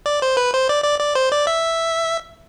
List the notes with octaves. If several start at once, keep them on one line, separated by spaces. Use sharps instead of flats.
D5
C5
B4
C5
D5
D5
D5
C5
D5
E5